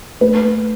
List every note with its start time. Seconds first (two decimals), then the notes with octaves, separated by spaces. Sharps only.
0.21 A3 B4